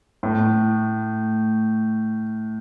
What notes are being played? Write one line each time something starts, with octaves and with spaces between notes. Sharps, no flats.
A2